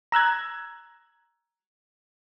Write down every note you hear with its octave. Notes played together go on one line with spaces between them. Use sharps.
A#5 E6 F#6 G#6